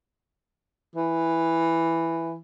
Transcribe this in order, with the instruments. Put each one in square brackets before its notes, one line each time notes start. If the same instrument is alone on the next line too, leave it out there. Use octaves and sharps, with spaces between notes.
[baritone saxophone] E3